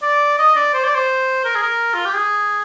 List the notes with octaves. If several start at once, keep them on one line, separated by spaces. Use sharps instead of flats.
D5
D#5
D5
C5
D5
C5
A#4
G#4
A#4
F4
G4
G#4